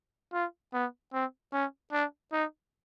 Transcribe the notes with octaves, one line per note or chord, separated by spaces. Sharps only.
F4
B3
C4
C#4
D4
D#4